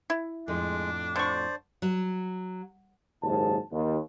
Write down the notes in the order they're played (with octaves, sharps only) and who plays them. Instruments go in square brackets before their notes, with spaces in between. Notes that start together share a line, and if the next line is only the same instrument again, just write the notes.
[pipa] E4
[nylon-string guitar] F2 A2 [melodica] G#3 [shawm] D4
[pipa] D3 C#6 [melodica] C5 D5
[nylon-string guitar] F#3
[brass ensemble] F#1 D#2 G#2 A5
D#2